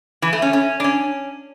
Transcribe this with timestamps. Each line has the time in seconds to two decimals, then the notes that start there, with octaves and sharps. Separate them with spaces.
0.22 E3
0.33 A3
0.42 C#4
0.53 C#4
0.80 D4
0.84 C#4